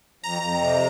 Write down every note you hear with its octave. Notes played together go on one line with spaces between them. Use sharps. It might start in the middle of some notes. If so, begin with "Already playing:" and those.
F2 A#5
F2
C3